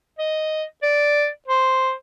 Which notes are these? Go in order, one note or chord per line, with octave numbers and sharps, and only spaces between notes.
D#5
D5
C5